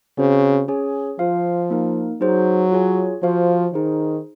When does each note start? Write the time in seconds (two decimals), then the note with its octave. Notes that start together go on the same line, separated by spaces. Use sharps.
0.18 C#3 C4 F#4 C5
0.68 C#4 G#4 C#5 G#5
1.19 F3 F4 C5 F5
1.70 A#3 D#4 A#4
2.21 F#3 D#4 G#4 C5
2.72 F4 G#4 C#5 G#5
3.23 F3 F#4 C5 F5
3.73 D#3 D#4 G#4 C5